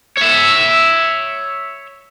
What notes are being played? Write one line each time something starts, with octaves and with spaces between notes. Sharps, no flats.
C#5 E5